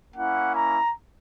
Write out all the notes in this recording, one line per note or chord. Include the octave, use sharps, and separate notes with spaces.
A#3 C#4 E4 F#5
A#5